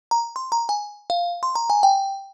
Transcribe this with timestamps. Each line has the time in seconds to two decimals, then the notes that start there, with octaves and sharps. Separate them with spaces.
0.11 A#5
0.36 C6
0.52 A#5
0.69 G#5
1.10 F5
1.43 C6
1.55 A#5
1.70 G#5
1.83 G5